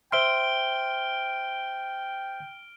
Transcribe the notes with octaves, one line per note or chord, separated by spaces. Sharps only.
C5 E5 G5 C6 F6 D7 G7